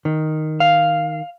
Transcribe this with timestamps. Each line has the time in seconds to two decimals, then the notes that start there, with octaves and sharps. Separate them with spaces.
0.05 D#3
0.60 F5